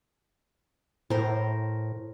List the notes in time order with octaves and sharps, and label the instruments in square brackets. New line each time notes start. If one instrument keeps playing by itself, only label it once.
[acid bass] A2 [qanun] A#4 C5